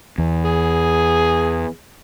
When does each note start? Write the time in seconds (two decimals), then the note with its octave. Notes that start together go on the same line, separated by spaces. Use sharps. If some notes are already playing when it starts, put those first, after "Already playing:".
0.18 E2
0.44 G#4